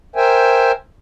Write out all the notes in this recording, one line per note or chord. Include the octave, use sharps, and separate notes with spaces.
A#4 C5 E5 G5 G#5